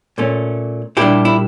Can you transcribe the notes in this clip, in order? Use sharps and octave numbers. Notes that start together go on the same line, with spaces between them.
A#2 A3 C#4
A#2 G3 D4 E4 G4
E4